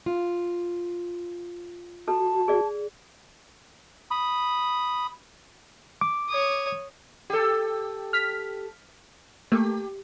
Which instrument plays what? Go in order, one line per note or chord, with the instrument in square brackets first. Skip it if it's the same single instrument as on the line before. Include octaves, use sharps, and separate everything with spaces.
[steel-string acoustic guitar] F4
[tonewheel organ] F#4 [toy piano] A4 [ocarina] A5
[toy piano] G#4 D5
[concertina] B5 D#6
[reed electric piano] D6
[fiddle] C#5 D#6
[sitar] G4 A4
[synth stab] F6 B6
[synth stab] A3 A#3 [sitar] G4